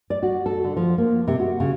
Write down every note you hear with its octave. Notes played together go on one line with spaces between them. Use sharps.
D5
F#4
A4
D3
F3
A#3
C3
F#4
C#3